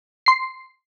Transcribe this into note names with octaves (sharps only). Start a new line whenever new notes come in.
C6 C7